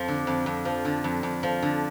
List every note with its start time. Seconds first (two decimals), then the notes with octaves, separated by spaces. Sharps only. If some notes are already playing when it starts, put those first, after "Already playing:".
Already playing: F2 F3
0.08 D3
0.27 F2
0.46 F2
0.65 F3
0.85 D3
1.04 F2
1.23 F2
1.43 F3
1.62 D3